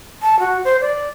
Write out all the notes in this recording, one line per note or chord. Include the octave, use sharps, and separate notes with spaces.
A5
F#4
C5
D5